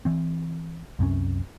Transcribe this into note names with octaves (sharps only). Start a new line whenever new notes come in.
E3 C4
C2 F#2 C3 C#4